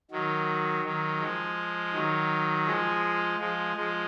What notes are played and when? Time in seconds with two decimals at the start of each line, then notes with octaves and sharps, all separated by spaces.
0.11 D#3 F#3
0.84 D#3 F#3
1.20 F3 G#3
1.93 D#3 F#3
2.66 F3 G#3
3.39 F3 G#3
3.76 F3 G#3